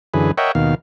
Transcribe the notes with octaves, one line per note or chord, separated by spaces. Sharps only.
F#2 D3 E3 G#4 B4
A#4 C#5 D#5 E5 F#5 G5
D#2 B2 D#3 F5